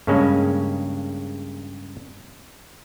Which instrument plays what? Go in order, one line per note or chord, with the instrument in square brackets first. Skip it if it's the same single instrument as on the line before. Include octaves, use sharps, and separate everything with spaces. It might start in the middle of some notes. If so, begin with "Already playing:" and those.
[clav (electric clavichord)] G2 C#3 G#3 A#3 C#4